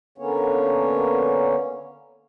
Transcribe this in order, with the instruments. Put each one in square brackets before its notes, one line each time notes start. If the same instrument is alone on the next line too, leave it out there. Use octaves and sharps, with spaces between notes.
[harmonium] D3 A#3 B3 C#4 C#5